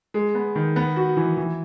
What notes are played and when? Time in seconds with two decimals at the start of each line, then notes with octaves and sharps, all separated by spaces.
0.14 G#3
0.35 B3
0.55 D#3
0.76 B3
0.96 F#4
1.17 E3
1.37 E3